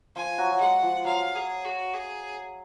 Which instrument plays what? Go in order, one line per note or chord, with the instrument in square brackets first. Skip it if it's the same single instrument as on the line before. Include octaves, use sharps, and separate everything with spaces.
[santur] F3 F4 [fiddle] G#5
[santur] F#3 F#4
F#3
[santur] G#3 [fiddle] F#5
[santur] F3
[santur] F#3 [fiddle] F5
[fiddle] G#4
F#4
G#4